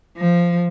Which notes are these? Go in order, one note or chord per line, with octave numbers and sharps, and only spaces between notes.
F3